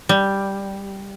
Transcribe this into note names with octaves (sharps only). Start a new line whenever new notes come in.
G3